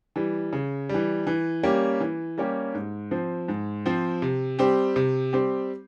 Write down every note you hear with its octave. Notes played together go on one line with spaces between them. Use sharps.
E3 G3
C#3
E3 G3
E3
G3 A#3 C#4 G4
E3
G3 A#3 C#4 G4
G#2
F3 C4
G#2
F3 C4
C3
G3 C4 G4
C3
G3 C4 G4